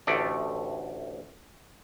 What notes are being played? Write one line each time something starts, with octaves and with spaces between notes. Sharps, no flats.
A1 D2 A3 D5